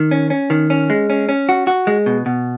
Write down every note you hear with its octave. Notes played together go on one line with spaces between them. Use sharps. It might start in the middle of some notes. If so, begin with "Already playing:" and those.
Already playing: D#3
C#4
C#4
D#3
C#4
G#3
C#4
C#4
F#4
F#4
G#3
B2
B2